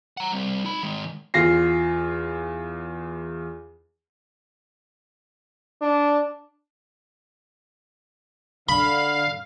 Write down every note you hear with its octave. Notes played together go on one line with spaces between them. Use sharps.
F#5 A#5
G3 C4
D#4 B5
D#3 G#3
E2 F4 A#6 C7
D4
D3 F5 B5